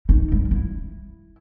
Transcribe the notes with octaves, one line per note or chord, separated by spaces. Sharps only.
D#4
G3
E4